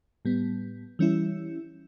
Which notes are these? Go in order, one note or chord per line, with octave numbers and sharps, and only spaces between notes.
A2 G3 B3
E3 G3 C#4 E4